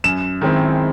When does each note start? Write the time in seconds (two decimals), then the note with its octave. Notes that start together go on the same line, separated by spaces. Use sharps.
0.04 F#2 E7
0.41 D#3 G#3 C4 E4